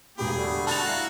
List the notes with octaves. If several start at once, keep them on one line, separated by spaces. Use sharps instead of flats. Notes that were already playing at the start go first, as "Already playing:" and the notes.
E1 G2 A#3 G4 G#4 G5 B5
D3 G3 A3
F#4 A4 A5 A6 F7
E4 F5 A#5